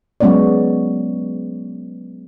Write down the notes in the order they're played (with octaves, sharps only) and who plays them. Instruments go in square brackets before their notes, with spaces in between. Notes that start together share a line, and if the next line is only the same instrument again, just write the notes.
[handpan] F#3 G#3 B3 C#4 C#5 D5